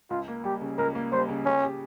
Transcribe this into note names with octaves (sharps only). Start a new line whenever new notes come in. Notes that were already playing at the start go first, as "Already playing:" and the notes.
C#2 F4
A#3
G3 G4
C#3
C#2 A#4
A#3
G3 C5
C#3
C#3 C#4
G4